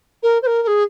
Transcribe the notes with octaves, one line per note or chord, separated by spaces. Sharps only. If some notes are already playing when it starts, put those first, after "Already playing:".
A#4
C5
A#4
A#4
G#4